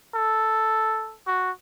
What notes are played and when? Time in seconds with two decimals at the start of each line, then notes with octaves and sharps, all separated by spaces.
0.15 A4
1.27 F#4